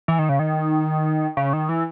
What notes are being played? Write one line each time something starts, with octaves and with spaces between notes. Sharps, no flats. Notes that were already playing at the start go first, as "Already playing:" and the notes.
E3
D#3
C#3
D#3
C#3
D#3
E3